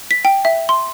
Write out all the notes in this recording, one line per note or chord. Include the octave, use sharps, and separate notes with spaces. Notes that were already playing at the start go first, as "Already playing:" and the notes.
B6
G5
E5
C6